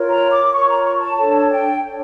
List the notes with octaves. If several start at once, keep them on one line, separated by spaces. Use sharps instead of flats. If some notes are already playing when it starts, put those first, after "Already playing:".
Already playing: F4 A#4 C#5
A#5
D6
F4 A#4 C#5 C#6
A#5
C#6
A5
D4 A4 C#5 A5
G5
D4 A4 C#5